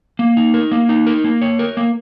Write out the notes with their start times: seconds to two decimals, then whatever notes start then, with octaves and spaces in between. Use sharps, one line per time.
0.19 A#3
0.37 D#4
0.54 A#4
0.72 A#3
0.89 D#4
1.07 A#4
1.24 A#3
1.42 C#5
1.59 A#4
1.77 A#3